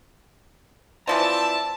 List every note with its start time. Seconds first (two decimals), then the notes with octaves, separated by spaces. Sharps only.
1.07 E3 F3 C4 D5 E5 A5